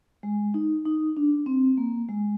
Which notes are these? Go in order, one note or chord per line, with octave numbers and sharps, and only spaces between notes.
G#3
D#4
D#4
D4
C4
A#3
G#3